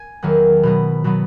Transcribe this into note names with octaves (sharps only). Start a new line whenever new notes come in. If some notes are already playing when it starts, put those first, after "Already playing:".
Already playing: G#5
E2 D#3 F#3 B3
B2 F#3 B3
B2 F#3 B3